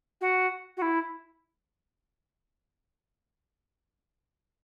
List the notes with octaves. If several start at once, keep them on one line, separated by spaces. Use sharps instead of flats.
F#4
F#4
E4